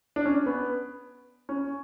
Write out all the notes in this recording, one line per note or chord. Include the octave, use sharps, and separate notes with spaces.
D4
C#4
B3
C#4